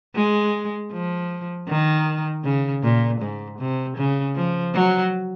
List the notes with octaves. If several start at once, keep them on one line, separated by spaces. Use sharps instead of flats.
G#3
F3
D#3
C#3
A#2
G#2
C3
C#3
F3
F#3